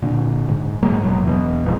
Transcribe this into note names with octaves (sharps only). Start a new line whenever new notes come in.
A#2 D3
G#2
G#2 F#3 G#3 A#3
F1 B2 F#3
E2 B2
G#1 F2 G#2